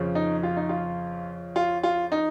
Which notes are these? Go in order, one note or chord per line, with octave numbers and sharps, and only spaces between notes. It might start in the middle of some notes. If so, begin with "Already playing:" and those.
Already playing: F2 C#3 F3
D#4
F4
D#4
F4
F4
F4
D#4